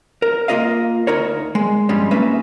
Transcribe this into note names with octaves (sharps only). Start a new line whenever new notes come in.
A#4
A#3 F4 A#4 D#5 F5
D2 D#4 A#4 C#5
G#3
G2 F3 G3 G#3 C#4
A#3 C#4 D#4 B4 E5